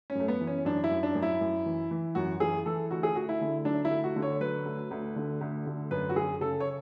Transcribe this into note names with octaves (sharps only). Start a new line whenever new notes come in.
C#4
F#2 A3
B3
E3
C#4
F#2 D4
E4
F#2
D4
F#2
E4
F#2
E3
E3
F#2 F#4
E3 G#4
E3 A4
D2 F#4
G#4
D2 F#4
E4
D3
F#3 D4
E4
D2
F#4
D3
C#5
F#3 B4
D2
D2
D3
D2
D3
F#2 B4
F#4
F#2 G#4
C#3 A4
C#5